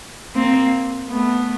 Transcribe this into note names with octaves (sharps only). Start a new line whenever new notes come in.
A#3 C4
A3 B3